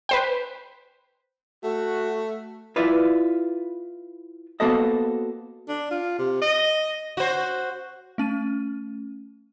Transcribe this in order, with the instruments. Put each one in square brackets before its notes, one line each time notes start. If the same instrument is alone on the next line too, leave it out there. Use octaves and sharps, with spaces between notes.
[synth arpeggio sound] B4 C5 G5
[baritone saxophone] A3 [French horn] F#4
[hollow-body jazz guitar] E4 F4 B4 D5
A#3 B3 F#4 A4 C5 D#5
[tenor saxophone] D4
F4
C3
D#5
[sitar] F#4 C5
[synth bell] A3 C#4 D#7